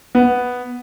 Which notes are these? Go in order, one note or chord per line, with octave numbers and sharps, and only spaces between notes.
B3